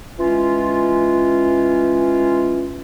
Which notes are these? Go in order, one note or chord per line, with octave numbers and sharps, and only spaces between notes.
E3 G#3 C#4 F4